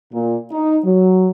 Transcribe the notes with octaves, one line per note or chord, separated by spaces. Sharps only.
A#2
D#4
F#3